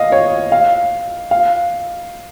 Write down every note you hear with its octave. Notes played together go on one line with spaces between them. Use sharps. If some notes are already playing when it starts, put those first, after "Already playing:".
Already playing: D#5 F5
C#5
F5
F5